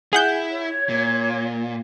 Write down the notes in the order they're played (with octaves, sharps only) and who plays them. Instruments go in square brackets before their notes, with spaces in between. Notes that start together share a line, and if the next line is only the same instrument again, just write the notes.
[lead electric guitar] E4 [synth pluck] G#4 F#5 G6
[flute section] C#5
[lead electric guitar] A#2